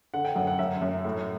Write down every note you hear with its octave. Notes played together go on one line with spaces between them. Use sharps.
D3 F#5
G5
F#2 F#5
F#5
F#2 E5
F#2
A2